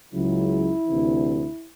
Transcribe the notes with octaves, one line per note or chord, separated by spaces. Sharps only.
C#2 C#3 F#3 E4
D2 C3 E3